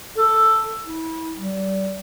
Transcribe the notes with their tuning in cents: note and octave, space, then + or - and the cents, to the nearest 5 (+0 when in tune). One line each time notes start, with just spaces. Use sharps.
A4 +5
E4 -25
G3 -30